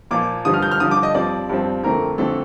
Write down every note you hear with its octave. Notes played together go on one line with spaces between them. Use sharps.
A#2 F3 A#3 D6
G2 D3 F3 D#6
F6
G6
F6
G2 D3 F3 D#6
D6
D#5
G2 F3 C4 D5
G2 F3 C4
F2 D3 A3 C4 A#4
F2 D3 A3 C4 A4